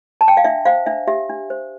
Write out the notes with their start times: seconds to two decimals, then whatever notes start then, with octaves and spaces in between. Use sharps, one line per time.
0.21 A5
0.28 G5
0.37 F5
0.44 D4 E5
0.65 C5 F5
0.86 D4 E5
1.08 G4 E5
1.30 D4
1.50 C5